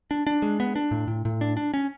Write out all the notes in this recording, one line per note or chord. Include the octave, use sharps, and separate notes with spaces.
D4
D4
G#3
B3
D4
A2
A2
A2
D4
D4
C#4